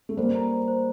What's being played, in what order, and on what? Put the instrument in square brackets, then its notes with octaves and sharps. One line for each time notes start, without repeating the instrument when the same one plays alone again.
[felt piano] A3
[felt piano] G3 A#3 [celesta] C5
[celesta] A#5
C5
C5